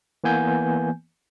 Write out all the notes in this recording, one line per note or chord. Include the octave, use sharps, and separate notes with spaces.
E3 A#3 B3 G#5 G6